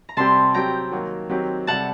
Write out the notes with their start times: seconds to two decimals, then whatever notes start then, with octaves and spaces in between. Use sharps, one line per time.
0.09 A#5
0.17 C3 G3 C4 G4 A5 C6
0.54 F#3 C4 G4 G5 A#5
0.92 D#3 F#3 A#3
1.29 D#3 F#3 C4 G4
1.67 C3 G3 C4 F#5 A5